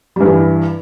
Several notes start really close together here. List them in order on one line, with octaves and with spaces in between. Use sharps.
G3 G2 E3